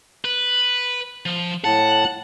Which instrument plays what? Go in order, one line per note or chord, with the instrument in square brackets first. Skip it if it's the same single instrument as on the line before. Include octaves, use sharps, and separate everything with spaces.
[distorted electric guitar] B4
F3
[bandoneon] A2 A5 [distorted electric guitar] F#5